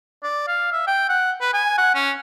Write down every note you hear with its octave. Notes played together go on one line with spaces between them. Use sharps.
D5
F5
E5
G5
F#5
B4
G#5
F#5
C#4